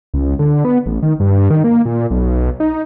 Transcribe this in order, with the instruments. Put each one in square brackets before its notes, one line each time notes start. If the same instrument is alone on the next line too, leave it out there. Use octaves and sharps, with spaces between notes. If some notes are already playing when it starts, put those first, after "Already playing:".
[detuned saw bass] C#2
D3
B3
A1
D#3
G2
D#3
A#3
A#2
B1
D#4